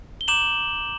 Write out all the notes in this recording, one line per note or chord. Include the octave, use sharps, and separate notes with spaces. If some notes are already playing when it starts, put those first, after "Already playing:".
G7
A#5 D6 G6 E7 F#7